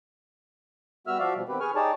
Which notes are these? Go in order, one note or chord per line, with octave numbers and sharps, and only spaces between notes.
G3 B3 F#4 E5 E6 F6
F3 F#4 D5 E5 F5
B2 F3 G3
D#3 B3 C4 G4 B4
G#4 B4 G#5 C#6 F6
D#4 G4 G#4 C#5 D5 A5